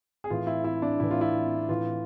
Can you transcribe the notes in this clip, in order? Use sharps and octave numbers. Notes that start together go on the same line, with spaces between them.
G#4
A2 E3 F4
E4
E4
D4
A2 E3 E4
F4
E4
A2 E3 F4